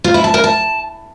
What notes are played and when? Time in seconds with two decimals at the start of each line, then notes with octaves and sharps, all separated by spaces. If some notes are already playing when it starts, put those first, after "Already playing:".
0.04 F4
0.14 E4
0.24 A5
0.34 A#4
0.44 A5